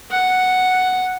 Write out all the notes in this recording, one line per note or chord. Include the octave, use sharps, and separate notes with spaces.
F#5